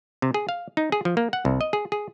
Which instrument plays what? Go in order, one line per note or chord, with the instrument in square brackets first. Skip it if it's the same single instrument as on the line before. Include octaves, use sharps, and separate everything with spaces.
[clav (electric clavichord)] C3
G#4
F5
D#4
G#4
F3
A#3
F#5
C2
D#5
G#4
G#4